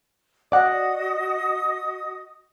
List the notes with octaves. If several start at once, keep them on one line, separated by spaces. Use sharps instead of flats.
F#4 D5 D#5 F#5 D#6